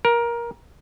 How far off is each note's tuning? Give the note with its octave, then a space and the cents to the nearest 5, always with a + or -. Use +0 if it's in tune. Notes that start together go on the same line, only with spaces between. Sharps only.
A#4 +15